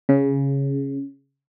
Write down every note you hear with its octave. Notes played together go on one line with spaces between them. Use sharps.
C#3